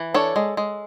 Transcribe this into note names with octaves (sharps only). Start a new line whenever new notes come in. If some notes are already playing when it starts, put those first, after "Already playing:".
Already playing: E3
D4 A4 C#5
G#3
G#3